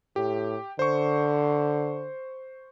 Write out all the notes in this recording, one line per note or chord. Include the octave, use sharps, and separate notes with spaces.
A2 G4
D3 C5 C#6